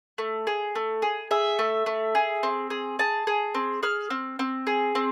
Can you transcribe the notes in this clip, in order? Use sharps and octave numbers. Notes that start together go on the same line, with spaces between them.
A3
G#4
A3
G#4
G#4 E5
A3
A3
G#4
C4
G#4
G#4 A5
G#4
C4
G#4 F6
C4
C4
G#4
C4